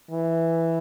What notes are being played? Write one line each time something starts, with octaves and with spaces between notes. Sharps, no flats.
E3